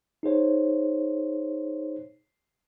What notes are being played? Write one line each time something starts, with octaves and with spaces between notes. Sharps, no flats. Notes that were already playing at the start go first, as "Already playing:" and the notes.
D#4 G#4 C5 C#5